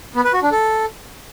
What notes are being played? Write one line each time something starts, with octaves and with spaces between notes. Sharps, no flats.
B3
B4
F#4
D4
A4